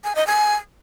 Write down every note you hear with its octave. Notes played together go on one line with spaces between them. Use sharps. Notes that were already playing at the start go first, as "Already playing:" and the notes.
G#5
D#5
G#5